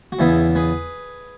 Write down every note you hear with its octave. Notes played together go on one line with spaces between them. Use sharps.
F#4
E2 C#3 E3 B3 E4
G#4 B4